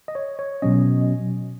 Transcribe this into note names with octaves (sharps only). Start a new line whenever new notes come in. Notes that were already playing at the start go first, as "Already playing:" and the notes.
D#5
C#5
C#5
B2 F#3 C#4 D#5